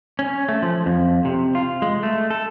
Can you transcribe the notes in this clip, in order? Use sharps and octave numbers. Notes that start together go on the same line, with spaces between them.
C#4
A3
F3
F2
C3
F4
G#3
A3
A4